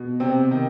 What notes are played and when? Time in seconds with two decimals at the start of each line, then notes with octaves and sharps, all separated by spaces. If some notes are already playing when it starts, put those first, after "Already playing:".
Already playing: B2
0.20 C3 C4
0.51 D#3